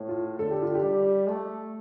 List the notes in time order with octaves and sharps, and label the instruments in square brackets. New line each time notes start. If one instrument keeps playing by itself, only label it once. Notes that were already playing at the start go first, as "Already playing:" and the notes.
Already playing: [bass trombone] A2
[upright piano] F4
[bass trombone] D3 [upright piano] A4
[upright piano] G4
F4
G4
[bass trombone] G3
A3